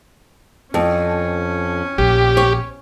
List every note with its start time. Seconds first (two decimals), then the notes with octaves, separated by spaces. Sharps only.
0.74 F2 C#4
1.98 A#1 G4
2.37 C#5